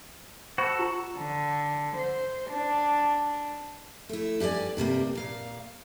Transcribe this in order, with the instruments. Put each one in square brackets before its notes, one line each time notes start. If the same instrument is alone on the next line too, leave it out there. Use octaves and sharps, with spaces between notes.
[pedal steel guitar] F#4 A4 [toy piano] C5 B5
[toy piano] F4 A#5
[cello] D3
C5
D4
[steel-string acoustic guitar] A3 E4
G2 G4 A#4 D5 G#5
G2 C3 G3 A#3
A#2 F5